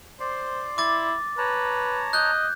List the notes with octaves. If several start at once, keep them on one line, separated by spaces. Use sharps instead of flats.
C5 D5 C6
E4 D6 A6
B4 C#5 A5 A#5
D#5 F#6 G6